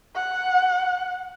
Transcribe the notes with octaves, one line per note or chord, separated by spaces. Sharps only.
F#5